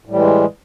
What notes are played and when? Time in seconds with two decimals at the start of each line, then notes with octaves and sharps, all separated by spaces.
0.05 A2
0.10 G3
0.14 E3
0.18 G#3